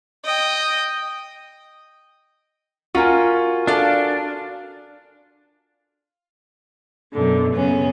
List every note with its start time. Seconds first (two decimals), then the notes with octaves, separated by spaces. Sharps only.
0.25 D#5 G5
2.95 A#3 C#4 F4 F#4 A#4 G#5
3.67 D4 A4 D5 F5
7.14 F#2 B2 D3
7.55 F#2 C#3 B3 C#4